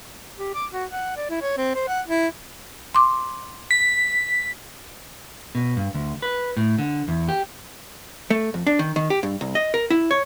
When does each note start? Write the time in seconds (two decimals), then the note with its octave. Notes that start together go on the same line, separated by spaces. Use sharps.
0.39 G4
0.55 D6
0.73 F#4
0.92 F#5
1.17 D5
1.30 E4
1.42 C#5
1.57 C4
1.75 C5
1.88 F#5
2.08 E4
2.95 C6 D6
3.71 B6
5.55 B2
5.77 G2
5.94 D2
6.22 B4
6.57 A2
6.79 D3
7.08 E2
7.28 G4
8.30 A3
8.54 F2
8.67 D4
8.79 D#3
8.96 D#3
9.10 G4
9.23 G2
9.41 C2
9.55 D#5
9.74 A#4
9.90 E4
10.11 C#5